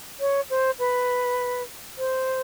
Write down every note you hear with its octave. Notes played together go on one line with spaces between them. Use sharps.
C#5
C5
B4
C5